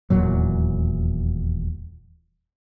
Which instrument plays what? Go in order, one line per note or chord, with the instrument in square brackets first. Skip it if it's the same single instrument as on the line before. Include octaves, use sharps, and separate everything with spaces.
[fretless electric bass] D#1 E2 A#2 F#3